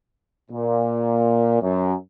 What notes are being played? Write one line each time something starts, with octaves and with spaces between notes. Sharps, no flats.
A#2
F#2